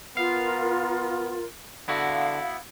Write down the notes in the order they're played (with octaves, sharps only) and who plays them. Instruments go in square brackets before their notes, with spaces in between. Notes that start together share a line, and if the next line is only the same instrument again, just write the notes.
[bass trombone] B3 [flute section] F4 A#4 [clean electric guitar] F5
[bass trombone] D3 [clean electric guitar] B3 E4 F#4 [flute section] F5